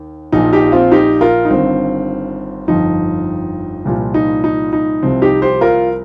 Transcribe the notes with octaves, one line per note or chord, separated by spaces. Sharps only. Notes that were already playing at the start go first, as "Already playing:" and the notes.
Already playing: D#2 D#3
A#1 A#2 F3 D#4
D#4 G4
C4 F4
D#4 G4
F4 A#4
D#4
G1 G2 D#3 C4 F4
G1 F2 F3 D#4
C2 A#2 F3
D#4
D#4
D#4
C2 C3 F3 C4
D#4 G4
G4 C5
F4 A#4